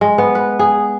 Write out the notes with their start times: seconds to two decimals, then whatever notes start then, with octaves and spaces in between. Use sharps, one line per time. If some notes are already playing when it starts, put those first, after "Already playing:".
0.01 G#3
0.18 B3
0.35 B4
0.59 G#4